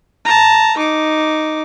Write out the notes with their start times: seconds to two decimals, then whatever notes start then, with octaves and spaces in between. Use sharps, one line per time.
0.25 A5 A#5
0.77 D#4 D6